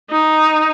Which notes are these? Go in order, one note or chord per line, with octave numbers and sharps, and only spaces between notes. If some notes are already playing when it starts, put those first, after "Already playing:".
D#4